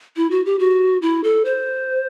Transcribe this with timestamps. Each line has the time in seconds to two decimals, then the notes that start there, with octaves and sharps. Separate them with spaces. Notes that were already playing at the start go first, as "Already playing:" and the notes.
0.16 E4
0.31 F#4
0.46 G4
0.59 F#4
1.02 E4
1.24 A4
1.45 C5